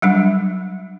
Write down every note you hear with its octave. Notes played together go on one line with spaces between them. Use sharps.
F#3 G3 D4